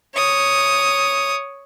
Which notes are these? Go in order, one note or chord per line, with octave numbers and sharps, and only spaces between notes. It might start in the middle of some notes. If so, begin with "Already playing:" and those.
C#5 D#6